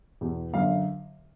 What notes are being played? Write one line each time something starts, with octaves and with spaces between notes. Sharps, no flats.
E2 B2
F#2 D3 F5